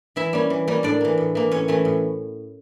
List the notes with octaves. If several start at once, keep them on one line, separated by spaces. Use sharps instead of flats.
E3 E4 E5
G3 A#3 C#4
E3
G3 A#3 C#4
A2 D4 D5
E3 A#3
A2
E3 A#3
A2 C#4 C#5
E3 A3 C#4
A2